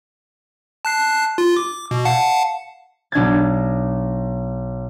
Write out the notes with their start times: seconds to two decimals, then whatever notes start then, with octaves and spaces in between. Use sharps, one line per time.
0.85 A5 F#6 C7
1.38 F4
1.56 D6
1.91 B2
2.05 F5 F#5 A5
3.12 B1 D4 G#6 A6